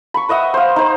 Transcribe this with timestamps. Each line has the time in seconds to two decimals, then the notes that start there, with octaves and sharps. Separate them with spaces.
0.14 B5 C#6
0.29 B4 D#5 E5 F#5
0.54 C5 F5
0.76 D#4 C5